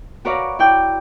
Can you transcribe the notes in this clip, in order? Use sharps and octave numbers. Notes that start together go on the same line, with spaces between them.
F#4 A#4 B4 C#5 D5 F5
E4 D5 G5